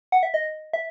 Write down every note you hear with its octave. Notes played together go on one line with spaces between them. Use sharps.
F#5
E5
D#5
E5